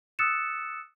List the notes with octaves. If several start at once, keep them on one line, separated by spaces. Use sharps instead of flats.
D#6 E6 F#6 A6 C#7 E7